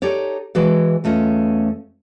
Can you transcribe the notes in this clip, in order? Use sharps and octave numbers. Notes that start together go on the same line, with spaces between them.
D#4 G4 A4 C#5 D5
E3 G#3 F#4 B4 D5
E2 A3 C#4 F4 D#5